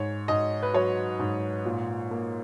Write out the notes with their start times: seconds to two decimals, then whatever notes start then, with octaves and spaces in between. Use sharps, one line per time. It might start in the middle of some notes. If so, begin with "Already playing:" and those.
Already playing: G#2 C#5
0.28 G#2 D#5
0.63 B4
0.74 F#3 C#5
1.19 G#2
1.65 A#2
2.11 A#3